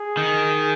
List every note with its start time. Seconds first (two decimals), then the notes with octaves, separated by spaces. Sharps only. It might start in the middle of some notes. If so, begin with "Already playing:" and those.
Already playing: G#4
0.17 D#3